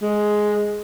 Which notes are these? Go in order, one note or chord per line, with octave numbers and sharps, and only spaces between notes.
G#3